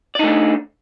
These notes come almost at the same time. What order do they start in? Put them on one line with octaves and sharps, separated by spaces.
D5 D#4 A3 D4